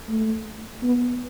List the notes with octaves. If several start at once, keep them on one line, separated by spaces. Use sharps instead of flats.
A3
B3